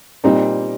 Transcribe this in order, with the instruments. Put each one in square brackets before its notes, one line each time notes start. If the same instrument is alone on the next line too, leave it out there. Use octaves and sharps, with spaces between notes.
[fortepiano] A#2 G3 C4 D#4